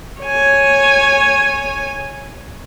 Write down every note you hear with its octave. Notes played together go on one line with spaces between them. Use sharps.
C#5 G#5